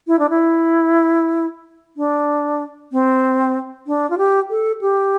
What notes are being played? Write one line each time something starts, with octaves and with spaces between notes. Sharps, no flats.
E4
D4
E4
D4
C4
D4
F4
G4
A4
G4